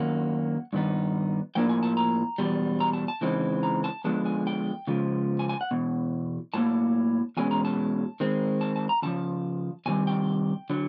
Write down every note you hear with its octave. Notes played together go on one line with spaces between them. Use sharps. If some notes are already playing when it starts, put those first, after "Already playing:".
Already playing: F#2 D#3 F#3 A#3 F#5
G2 D#3 B3 D#4
A2 F3 A#3 D4 G5
G#5
A5
A#5
E2 B2 G3
A#5
A5
A5
C#3 E3 G#3 C4 D#4
A#5
A5
D3 F3 G#3 B3 A5
G#5
G5
C#3 F3 G#3
G#5
G#5
F#5
E2 B2
A2 F#3 A#3 A5
E2 B2 G#3 C#4 G#5
A#5
A5
D#3 G#3 C4
A5
A5
A#5
E2 C#3 F3 A5
E2 C3 D#3 G3 G#5
G5
D3 F#3